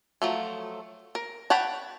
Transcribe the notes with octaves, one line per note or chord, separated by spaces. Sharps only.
F3 F#3 A3
A#4
C#5 F#5 G5 A5 B5